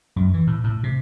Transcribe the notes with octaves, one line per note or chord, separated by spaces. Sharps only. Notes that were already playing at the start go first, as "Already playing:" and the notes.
F#2
E3
A2
A2
C3